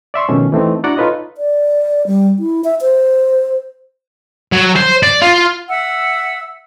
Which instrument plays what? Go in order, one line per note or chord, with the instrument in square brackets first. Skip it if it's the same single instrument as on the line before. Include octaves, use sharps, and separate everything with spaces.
[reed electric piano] D5 E5 C6 C#6
B2 D#3 F3 A3 C#4
E3 A3 C4 D#4
D4 E4 F#4 D5 F#5 A#5
D#4 F4 A4 B4 C#5 D#5
[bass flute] D5
G3
E4
E5
C5
[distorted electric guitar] F#3
C5
D5
F4
[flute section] E5 F#5 E6